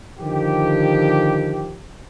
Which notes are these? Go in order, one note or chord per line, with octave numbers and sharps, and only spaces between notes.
D3 D#3 F3 G4